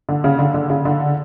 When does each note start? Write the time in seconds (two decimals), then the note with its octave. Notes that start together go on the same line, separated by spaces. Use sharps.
0.09 D3
0.24 C#3
0.39 D3
0.54 D3
0.70 C#3
0.85 D3